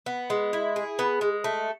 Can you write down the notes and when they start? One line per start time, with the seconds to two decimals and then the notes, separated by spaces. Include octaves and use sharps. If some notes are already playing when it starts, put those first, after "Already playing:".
0.06 B3
0.30 G#3
0.53 E4
0.76 G#4
0.99 B3
1.21 G#3
1.44 A3